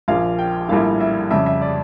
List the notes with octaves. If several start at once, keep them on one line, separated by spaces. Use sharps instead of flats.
A#1 A#2 F3 F5
G5
A#1 A2 G3 A#3 E4 F5
E5
F2 C#3 G3 E5
E5
D5